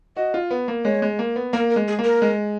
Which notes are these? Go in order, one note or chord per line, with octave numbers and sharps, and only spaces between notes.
F#4 D#5
F4
B3
A#3
G#3 C#5
G#3
A#3
B3
A#3 A#4
A#4
G#3
G#4
A#3
A#4
G#3